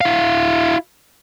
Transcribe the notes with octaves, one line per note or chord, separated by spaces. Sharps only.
E4 F5